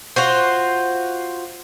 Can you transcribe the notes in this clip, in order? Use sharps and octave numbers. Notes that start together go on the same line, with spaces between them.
F4 F#4 C5